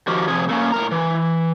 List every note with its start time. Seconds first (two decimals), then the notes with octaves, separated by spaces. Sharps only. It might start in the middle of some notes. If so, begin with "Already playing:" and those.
0.07 D#3 F3 F#4 G4 A#4
0.28 C3 F3 G#4
0.49 A3 A#3 C#4
0.72 A2 A#4 A#5
0.92 E3